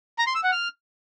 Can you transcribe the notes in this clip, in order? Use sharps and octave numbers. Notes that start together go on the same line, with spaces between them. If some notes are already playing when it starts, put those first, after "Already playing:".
A#5
C6
E6
F#5
F6